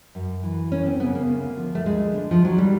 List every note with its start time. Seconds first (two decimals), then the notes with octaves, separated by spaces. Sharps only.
0.15 F#2
0.43 E3
0.72 F#2 C#4
0.86 C4
1.00 C#3 B3
1.15 A#3
1.28 D2
1.57 F3
1.75 A3
1.86 D2 G#3
2.14 D3
2.31 F3
2.43 D#3 F#3
2.58 G3